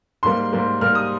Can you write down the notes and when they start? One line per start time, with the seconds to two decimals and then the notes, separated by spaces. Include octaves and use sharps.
0.23 G#2 G3 A#3 C6
0.53 G#2 G3 A#3
0.81 G#2 G3 A#3 F6
0.95 D#6